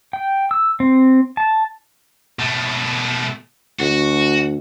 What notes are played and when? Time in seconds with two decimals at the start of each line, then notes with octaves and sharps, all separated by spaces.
0.13 G5
0.51 E6
0.80 C4
1.37 A5
2.39 B2 A3
3.80 D2 F#4